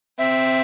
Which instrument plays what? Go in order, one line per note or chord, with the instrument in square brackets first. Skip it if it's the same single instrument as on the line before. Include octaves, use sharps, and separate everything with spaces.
[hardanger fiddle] C4 [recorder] E5